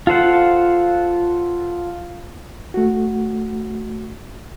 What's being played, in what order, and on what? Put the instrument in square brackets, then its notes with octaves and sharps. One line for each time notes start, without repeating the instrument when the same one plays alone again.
[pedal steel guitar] F4 A4 C5 F#5
[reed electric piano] A3 F#4